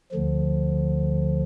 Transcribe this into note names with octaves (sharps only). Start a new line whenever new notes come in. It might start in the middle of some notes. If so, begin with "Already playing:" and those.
D2 D3 F3